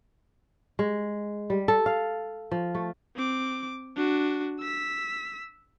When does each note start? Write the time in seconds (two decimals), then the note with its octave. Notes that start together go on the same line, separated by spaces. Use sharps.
0.79 G#3
1.50 G3
1.68 A4
1.86 F5
2.51 F3
2.75 A3
3.16 C4 D6
3.96 D4 F#4
4.59 E6 B6